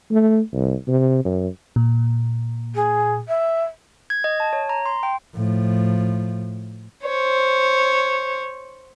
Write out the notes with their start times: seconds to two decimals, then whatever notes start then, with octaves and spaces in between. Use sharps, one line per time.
0.11 A3
0.53 C2
0.88 C3
1.25 F#2
1.76 A#2
2.75 G#4
3.28 E5
4.10 G#6
4.24 D#5
4.40 A5
4.53 C#5
4.69 A#5
4.86 C6
5.03 G5
5.34 A2 F3
7.04 C5 C#5